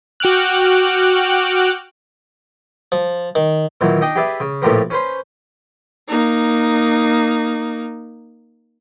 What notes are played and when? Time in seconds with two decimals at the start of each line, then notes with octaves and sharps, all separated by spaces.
0.20 F#4 G5 D6 F6 F#6
2.92 F3
3.35 D#3
3.81 A#2 D#3 E3 F#3
4.01 D4 D#4 D#5 G5
4.15 G4 G#4 B4 D5 E5
4.40 C#3
4.62 A#1 A2 F4 G4 A#4 B4
4.90 C#4 B4 C5
6.08 A#3 D#4